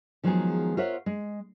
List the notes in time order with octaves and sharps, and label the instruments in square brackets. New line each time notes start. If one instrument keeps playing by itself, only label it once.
[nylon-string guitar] D#3 F3 F#3 G#3 B3 G#4
F4 A#4 C5 C#5 E5 F#5
G#3